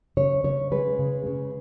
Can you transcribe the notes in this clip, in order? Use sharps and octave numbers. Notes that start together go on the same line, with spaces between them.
C#3 C#5
C#3 C#5
G#3 B4
C#3
C#3